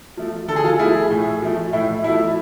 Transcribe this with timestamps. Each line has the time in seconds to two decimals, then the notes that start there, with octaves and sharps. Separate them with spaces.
0.17 F3 A3
0.48 D3 A4
0.56 G#4
0.64 F4 A4
0.79 F3 A3 E4 G#4
1.10 A2
1.42 F3 A3
1.73 A2 E4
2.04 F3 A3 E4